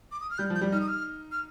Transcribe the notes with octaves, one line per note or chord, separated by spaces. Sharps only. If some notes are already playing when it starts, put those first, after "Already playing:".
D6
D#6
F6
G3 G6
F3
G6
G3
D#4 F6
D#6
F6
F6